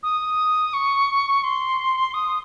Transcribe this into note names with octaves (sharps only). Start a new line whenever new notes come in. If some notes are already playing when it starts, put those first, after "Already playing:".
D#6
C#6
C6
D#6